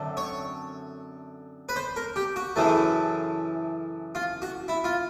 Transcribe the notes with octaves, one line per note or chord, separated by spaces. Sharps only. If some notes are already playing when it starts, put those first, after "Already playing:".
Already playing: F#2 D3 A3 C4
C#5
B4
C5
A#4
G4
F#4
F#2 C#3 E3 A3
F4
F#4
E4
F4